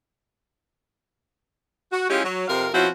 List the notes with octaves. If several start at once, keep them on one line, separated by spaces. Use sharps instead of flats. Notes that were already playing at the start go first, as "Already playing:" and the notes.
F#4
G#3 C#4 E4 F4 G4
F#3
F2 C3 A#4 F5
B2 F3 C4 C#4 E4 F#4